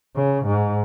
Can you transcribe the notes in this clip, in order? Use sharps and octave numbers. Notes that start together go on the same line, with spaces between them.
C#3
G#2